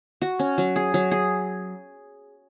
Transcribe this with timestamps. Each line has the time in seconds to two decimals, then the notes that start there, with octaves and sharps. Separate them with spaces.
0.22 F#4
0.39 C#4
0.58 F#3
0.76 G#4
0.94 F#3
1.11 G#4